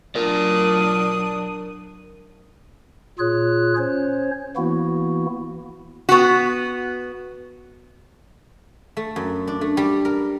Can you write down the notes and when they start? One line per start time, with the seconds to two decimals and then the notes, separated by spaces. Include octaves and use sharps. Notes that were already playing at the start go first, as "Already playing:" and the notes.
0.15 F#3 D4 A#4 D5 D#6
3.19 A#2 F4 G#4 C#5 F#6
3.77 C#4 C5 C#5
4.56 E3 A#3 B3 E4 F#4
6.09 B3 F#4
8.97 A3
9.16 F#2
9.47 D4
9.61 A3
9.77 G3
10.05 A#4